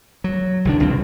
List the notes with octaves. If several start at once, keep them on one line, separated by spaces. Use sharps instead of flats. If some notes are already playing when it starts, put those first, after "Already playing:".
F#3
C2 D#3 D4
C#2 C3 G3 C4